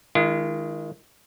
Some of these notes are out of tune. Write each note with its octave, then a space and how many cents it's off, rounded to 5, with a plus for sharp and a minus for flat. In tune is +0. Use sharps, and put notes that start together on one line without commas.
D#3 +0 G#3 +0 F4 -45